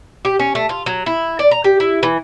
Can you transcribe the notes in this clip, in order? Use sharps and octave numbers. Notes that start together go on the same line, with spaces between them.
G4
C#4
A3
F4
F#3
E4
D5
A#5
G4
E4
E3